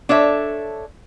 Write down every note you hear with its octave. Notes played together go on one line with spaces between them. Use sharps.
D4 A4 C#5 E5